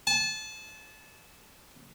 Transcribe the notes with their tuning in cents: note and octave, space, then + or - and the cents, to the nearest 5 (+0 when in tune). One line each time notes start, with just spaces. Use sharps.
A5 -25